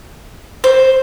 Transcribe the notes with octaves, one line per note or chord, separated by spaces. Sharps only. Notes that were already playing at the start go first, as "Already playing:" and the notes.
C5